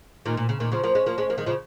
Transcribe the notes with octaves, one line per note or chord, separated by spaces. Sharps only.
A#2 D#3
A#2
C#3
A#2 D#3
C#3 F3
F3 A#3
G#3 C#4
F3 A#3
G#3 C#4
F3 A#3
D#3 G#3
C#3 F3